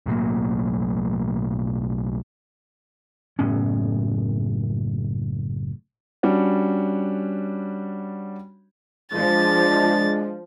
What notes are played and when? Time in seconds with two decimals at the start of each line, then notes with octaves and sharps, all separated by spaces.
0.06 B1 A2 F#3 A#3
3.39 F#1 A2 B3 C#4
6.23 G3 C#4 D4 F#4 C#5
9.13 F3 G#3 D4 A6